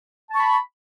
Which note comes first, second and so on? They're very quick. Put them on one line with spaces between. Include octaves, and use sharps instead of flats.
A5 C#6 B5